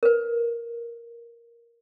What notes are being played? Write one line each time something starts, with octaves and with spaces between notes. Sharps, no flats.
A#4 B4